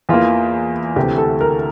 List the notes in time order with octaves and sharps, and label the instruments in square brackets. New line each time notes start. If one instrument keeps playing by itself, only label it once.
[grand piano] E2 E3 A#3 F4
D2 C3 E3 A3 G4
A4
A#4